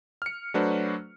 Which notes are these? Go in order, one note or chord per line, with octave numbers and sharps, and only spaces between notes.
F6 C#7
F#3 A3 D4 F#4 B4 C5